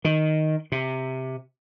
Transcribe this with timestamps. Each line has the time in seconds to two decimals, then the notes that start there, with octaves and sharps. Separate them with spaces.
0.05 D#3
0.72 C3